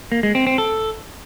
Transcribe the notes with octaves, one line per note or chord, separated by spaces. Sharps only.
A#3
G#3
C4
C4
A4